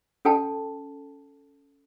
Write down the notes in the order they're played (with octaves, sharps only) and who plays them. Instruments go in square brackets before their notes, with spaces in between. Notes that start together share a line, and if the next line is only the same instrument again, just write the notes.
[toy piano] C#4 A4 G5 A5